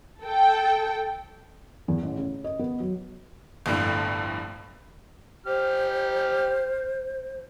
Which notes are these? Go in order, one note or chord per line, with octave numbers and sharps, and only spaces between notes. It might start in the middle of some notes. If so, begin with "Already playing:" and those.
A4 G5
E2
A1
C#3
D#5
B3
F#3
G1 C2 F2 A2 D3
G4 C5 F6